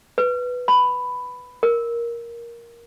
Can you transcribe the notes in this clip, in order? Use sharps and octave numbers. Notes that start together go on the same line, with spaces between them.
B4
B5
A#4